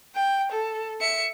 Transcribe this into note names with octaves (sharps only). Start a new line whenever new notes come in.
G5
A4
E5 C#7